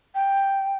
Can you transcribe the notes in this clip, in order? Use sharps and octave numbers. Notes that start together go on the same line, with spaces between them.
G5